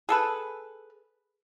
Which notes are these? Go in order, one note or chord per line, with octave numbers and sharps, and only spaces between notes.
G#4 A4 B4